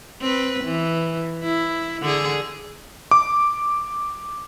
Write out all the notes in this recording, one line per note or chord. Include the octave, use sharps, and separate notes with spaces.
C4 B4
E3
E4
D3 G#4
D6